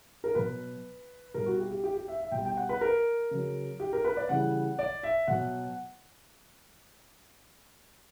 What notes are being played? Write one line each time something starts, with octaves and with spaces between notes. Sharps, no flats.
A#4
B2 F#3 B4
B2 G3 A#4
F#4
G4
G4
G4
G4
E5
E5
B2 G3 G5
G5
F#5
B4
A#4
C#3 F#3
G4
A#4
B4
D5
C#3 E3 G3 F#5
D5
E5
B2 F#3 F#5